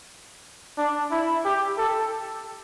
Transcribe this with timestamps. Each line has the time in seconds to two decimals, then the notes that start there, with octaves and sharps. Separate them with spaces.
0.78 D4
1.11 E4
1.45 G4
1.78 A4